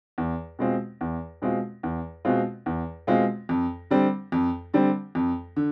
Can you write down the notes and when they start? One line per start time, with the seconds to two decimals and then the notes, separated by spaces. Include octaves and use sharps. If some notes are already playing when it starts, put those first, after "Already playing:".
0.18 E2
0.59 B2 G#3 C4 F4
1.01 E2
1.42 B2 G#3 C4 F4
1.83 E2
2.25 B2 G#3 C4 F4
2.66 E2
3.07 B2 G#3 C4 F4
3.49 F2
3.90 D3 G3 C4
4.32 F2
4.74 D3 G3 C4
5.15 F2
5.56 D3